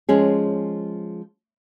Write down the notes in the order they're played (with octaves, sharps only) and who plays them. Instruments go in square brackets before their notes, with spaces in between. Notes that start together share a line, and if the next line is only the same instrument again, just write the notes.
[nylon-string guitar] F3 G#3 C#4 G#4